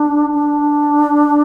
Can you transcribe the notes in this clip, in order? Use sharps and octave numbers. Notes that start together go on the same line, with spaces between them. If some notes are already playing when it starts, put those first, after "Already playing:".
Already playing: D4
D4